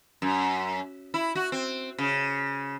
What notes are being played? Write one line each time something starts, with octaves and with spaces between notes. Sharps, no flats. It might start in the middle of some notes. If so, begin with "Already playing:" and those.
F#2
E4
F#4
C4
C#3